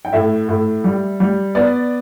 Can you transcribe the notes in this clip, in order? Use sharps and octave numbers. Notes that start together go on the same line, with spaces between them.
G5
A2 E5
A2
G3
G3
B3 D5